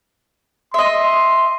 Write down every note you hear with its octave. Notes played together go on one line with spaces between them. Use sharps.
D#5 E5 C6